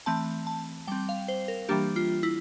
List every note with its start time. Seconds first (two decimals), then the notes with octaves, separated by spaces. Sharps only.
0.06 E3 A3 C4 A5
0.47 A5
0.87 G3 C4 G5
1.09 F5
1.28 C5
1.48 A#4
1.69 E3 G3 A#3 D4 G4
1.96 F4
2.23 E4